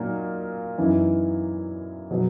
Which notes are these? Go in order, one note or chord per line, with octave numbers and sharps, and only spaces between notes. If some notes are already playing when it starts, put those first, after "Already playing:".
Already playing: A#2 F#3 A#3 D#4
F#2 E3 B3 D#4
B2 F#3 B3